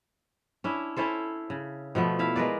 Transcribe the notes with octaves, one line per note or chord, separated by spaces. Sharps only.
C#4 D4 E4
C#4 E4 A4 C5
C#3
B2 F3 A3 B3
E4 E5 F5
G#3 A#4 B4 D5